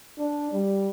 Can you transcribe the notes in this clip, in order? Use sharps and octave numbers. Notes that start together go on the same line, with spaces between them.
D4
G3